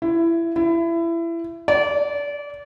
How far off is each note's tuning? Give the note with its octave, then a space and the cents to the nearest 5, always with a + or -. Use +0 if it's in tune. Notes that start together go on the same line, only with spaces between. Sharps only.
E4 +20
E4 +25
D5 -30